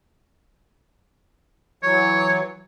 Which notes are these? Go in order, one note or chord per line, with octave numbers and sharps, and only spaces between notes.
E3 F#3 C#5